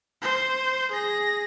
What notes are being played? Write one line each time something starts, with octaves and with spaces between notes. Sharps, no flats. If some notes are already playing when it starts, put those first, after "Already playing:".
C5
G#4 A#6